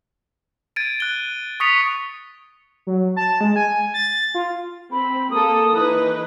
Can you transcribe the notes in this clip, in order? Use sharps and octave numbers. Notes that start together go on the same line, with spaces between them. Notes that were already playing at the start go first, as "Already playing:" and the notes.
G#6 A6 D7 D#7
F#6 G7
C#6 D#6 A6 B6 C#7 F7
F#3
A5
G#3
G#5
A6
F4
C4 B5
A#3 A4 D#6
E3 D#4 B4